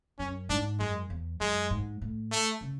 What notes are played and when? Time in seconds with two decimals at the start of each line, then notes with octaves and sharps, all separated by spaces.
0.19 F#2 C#4
0.49 G#2 D4
0.79 F#2 G#3
1.10 E2
1.40 F#2 G#3
1.70 G#2
2.02 A2
2.32 A3
2.61 C#3